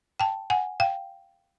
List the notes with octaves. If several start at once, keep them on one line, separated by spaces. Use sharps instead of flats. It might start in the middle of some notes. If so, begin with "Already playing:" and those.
G5 A5
F#5 G#5
F5 G5